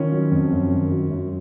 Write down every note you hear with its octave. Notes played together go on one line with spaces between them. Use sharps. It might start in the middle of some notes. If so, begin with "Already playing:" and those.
Already playing: D#3 C#4 F4
F#3
F2
F#2
D#3
F#3
F#2